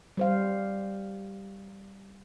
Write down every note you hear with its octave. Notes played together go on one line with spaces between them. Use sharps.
G3 C5 F5